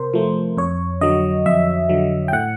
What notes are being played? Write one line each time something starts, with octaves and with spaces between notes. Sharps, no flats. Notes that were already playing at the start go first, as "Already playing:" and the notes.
Already playing: C3 A#4 C5
F3 A3
F2 C#5
D3 F#3 D#5
F2 E5
D3 F#3
G5
A2 F#5